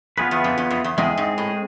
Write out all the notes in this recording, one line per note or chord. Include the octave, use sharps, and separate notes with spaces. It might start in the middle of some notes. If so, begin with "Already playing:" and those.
F2 B3 F4 G#4 B4
E2
F2
E2
F2
E2
E2 G#3 C4 G#4
G#2
A2